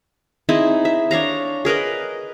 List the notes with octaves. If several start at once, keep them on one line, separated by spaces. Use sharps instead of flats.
C4 D#4 E4 G#4
E5
D4 C#5 F5 A#5
G#4 A#4 B4 D#5